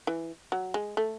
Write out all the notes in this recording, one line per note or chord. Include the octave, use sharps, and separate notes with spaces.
E3
F#3
G#3
A3